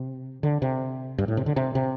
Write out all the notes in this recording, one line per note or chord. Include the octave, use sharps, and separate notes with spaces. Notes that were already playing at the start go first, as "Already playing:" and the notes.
Already playing: C3
D3
C3
G2
A2
C3
D3
C3
C3